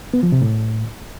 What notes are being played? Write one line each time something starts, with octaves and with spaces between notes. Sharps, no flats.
B3
F3
C3
A2